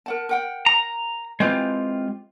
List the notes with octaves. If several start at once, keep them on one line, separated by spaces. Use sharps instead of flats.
A#4 F#5 A5
A#4 F#5 G5
A#5
G#3 C4 E4 F4 G4 B4